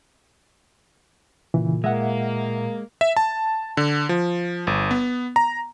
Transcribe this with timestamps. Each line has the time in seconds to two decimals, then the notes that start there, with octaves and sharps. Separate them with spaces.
1.54 A#2 C#3 E3
1.84 G#3 A#3 E5 F#5
3.01 E5
3.17 A5
3.77 D3
4.09 F3
4.67 G1
4.91 B3
5.36 A#5